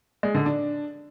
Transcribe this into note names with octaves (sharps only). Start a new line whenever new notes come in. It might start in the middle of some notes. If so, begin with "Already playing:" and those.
G#3
D3
D4